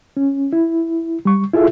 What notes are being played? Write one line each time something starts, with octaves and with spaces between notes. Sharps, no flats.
C#4
E4
G3 C#6
E4 F4 G#4 A4 E5